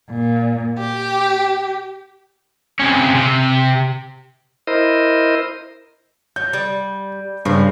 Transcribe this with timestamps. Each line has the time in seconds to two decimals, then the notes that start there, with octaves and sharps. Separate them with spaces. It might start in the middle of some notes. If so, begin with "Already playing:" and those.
0.11 A#2
0.78 G4
2.79 C3 C#4
3.15 C3
4.67 E4 A#4 C5 D#5
6.36 F#3 G6
6.53 G3
7.45 G2 C#3 F3